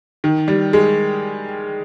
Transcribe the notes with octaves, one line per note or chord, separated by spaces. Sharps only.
D#3
G3
G#3